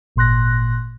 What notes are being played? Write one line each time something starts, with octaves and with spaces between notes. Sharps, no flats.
G#1 A#2 C6 F#6 A#6